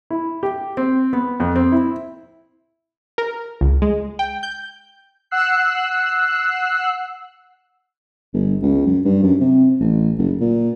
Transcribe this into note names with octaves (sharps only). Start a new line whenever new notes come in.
E4
G4
C4
B3
F2
C4
E4
A#4
C#2
G#3
G5
G6
F#5 E6 F#6 C7
G1
C#2
F#2
G2
F#2
C3
A1
F#1
A#2